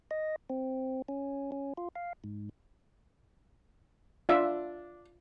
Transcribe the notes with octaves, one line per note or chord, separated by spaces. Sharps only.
D#5
C4
C#4
C#4
F4
F5
G#2
D4 F4 E5